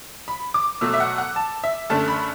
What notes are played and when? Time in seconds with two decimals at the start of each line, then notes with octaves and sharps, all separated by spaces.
0.28 B5
0.54 D6
0.81 B2 F#3 A3 E6
0.94 E5
1.00 F#5
1.18 F#5
1.36 A5
1.64 E5
1.90 F#2 D3 A3 A5
2.08 B5